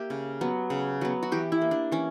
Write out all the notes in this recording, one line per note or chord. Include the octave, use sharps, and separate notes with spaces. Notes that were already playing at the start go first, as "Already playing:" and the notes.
Already playing: A#3 G4 E5
C#3
F#3 B3
C#3
F#3 B3
F#4
E3 G4
E4
A#3
D4
E3 C#4